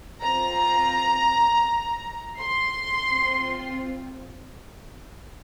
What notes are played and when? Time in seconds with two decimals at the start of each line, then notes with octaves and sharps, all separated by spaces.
0.21 C4 F4 A#5
2.37 C6
3.10 C4 F4